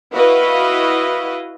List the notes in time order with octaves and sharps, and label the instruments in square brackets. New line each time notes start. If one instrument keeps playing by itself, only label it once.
[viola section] E4 F#4 B4 D#5 F5